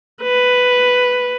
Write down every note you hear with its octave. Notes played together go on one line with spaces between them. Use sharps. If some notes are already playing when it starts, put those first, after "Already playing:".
B4